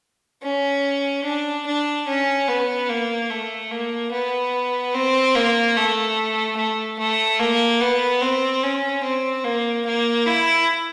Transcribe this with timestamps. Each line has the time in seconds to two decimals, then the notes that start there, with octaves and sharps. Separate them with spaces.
0.43 C#4
1.24 D4
1.67 D4
2.07 C#4
2.48 B3
2.89 A#3
3.30 A3
3.71 A#3
4.12 B3
4.94 C4
5.35 A#3
5.76 A3
6.57 A3
6.99 A3
7.39 A#3
7.81 B3
8.21 C4
8.63 C#4
9.04 C4
9.44 A#3
9.86 A#3
10.26 E4